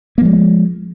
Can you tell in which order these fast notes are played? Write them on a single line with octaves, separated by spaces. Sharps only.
A#3 F3 G#3